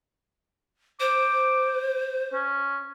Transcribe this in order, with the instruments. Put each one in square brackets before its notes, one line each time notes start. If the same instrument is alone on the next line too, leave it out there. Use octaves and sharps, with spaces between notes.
[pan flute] C5 [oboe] D6
[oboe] C#4